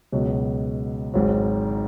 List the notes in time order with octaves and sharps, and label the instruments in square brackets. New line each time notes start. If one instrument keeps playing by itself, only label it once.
[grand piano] C#2 B2 F#3
G#1 G#2 F#3